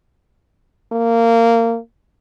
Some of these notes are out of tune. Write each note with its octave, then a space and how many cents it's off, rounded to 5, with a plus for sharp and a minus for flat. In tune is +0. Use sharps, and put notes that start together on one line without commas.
A#3 -20